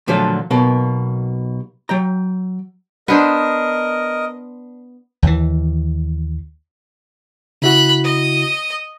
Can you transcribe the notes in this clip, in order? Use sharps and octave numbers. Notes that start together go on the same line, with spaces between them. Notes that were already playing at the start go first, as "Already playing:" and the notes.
A#2 D3 F3 F#3 A3 F4
B1 B2 A#3
F#3 G5 A#5
B3 D4 A#4 C5 D#5
D#2 E3
C#3 E4 F#4 B5 F#6
D#5